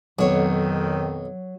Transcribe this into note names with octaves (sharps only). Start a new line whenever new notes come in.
B1 F2 D#3 F#3 C#5